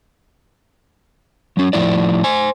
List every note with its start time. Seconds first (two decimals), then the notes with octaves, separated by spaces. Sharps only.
1.57 F#3 C#4
1.73 A2 F3 A#3 E4 D5
2.24 C5 G#5